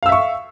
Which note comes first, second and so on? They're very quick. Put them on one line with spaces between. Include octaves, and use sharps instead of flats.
F5 E6 E5 C#6